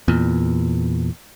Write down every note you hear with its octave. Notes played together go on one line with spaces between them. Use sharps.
E2 A#2